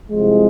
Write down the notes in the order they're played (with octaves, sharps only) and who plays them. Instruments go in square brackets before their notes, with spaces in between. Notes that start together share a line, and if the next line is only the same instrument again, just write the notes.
[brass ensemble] C2 C3 F3 G#3